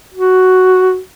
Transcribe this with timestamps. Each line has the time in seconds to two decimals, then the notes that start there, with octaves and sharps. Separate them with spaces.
0.15 F#4